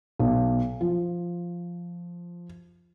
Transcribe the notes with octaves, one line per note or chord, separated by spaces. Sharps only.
B1
F3